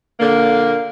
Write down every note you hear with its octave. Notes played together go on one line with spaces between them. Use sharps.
A#2 D3 A#3